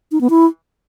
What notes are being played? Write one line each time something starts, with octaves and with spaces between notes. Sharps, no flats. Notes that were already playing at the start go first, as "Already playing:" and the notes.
D#4
B3
E4